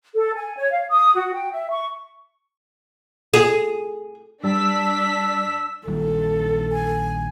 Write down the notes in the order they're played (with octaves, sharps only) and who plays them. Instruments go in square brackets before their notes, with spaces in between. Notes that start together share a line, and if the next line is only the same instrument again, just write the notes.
[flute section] A4
G#5
C#5
F5
D#6
F#4
G5
E5
C#6
[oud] G#4
[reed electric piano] G2 G3 A5 [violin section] D4 B6 [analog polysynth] E6
[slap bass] A#1 D#3 G3 [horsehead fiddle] A4
[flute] G#5